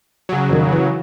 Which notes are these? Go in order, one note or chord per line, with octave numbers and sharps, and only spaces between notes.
C#3 F#3
F2 A#2 D#3
E3